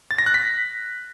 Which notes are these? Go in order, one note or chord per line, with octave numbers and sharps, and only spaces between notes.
A6
A#6
F#6
B6